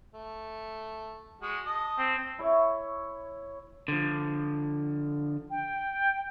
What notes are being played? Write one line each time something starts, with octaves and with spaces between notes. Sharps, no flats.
A3
G#3 F#4
D#5 A5
C4
E4 C#5
D3 F3
G5